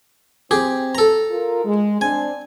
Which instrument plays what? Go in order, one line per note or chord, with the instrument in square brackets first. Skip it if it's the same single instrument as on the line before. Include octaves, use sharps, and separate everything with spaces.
[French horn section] C4 [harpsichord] G4 G#4
[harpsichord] A4 A#5
[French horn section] F4 A#4
G#3
[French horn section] C4 D4 [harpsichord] G#5